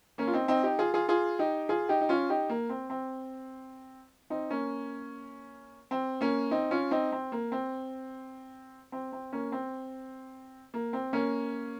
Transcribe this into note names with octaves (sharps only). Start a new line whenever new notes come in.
A#3 C#4
F4
C4 D#4
C4 D#4
D#4 G4
F4 G#4
F4 G#4
F4 G#4
D#4 G4
F4 G#4
D#4 G4
D#4
C#4 F4
D#4 G4
A#3
C4
C4
C4 D#4
A#3 C#4
C4
A#3 C#4
C4 D#4
C#4 F4
C4 D#4
C4
A#3
C4
C4
C4
A#3 C#4
C4
A#3
C4
A#3 C#4